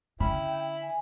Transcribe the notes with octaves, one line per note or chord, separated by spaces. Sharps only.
D3 C#4 E4 G5 B5
G#5